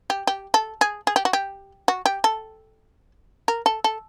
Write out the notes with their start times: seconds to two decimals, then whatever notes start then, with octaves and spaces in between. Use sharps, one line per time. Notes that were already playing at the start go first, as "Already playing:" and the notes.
0.10 G4
0.27 G4
0.54 A4
0.81 G#4
1.07 G#4
1.16 G4
1.25 F#4
1.33 G4
1.88 F#4
2.06 G4
2.24 A4
3.48 A#4
3.66 A4
3.84 A4